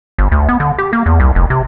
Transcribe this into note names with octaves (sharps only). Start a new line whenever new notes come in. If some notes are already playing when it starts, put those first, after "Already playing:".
G1
D2
B3
D3
G4
A#3
E2
C2
F1
C3